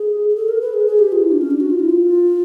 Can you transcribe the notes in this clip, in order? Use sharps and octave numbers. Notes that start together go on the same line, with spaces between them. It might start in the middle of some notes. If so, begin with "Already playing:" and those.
Already playing: G#4
G#4
A4
A#4
B4
G#4
G#4
G4
F4
E4
D4
C#4
D4
F#4
F4
E4
F4